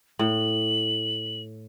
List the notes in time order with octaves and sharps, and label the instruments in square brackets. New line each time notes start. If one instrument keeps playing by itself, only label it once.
[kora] A2 [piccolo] F#7